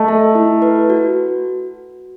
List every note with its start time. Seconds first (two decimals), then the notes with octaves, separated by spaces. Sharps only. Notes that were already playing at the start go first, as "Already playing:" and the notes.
Already playing: A3 D#5
0.08 A4
0.35 E4
0.62 B4
0.90 F#4